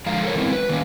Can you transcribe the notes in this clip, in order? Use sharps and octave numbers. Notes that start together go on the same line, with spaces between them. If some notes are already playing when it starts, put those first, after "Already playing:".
D3 F3 G#3 F4 F5 A#5
A4 A#4 C#5
D3 E3 G#3 B3 C4 E4
B4
D#3 A#3 C#4